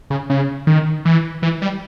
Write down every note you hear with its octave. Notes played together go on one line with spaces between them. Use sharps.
C#3
C#3
D#3
E3
E3
G3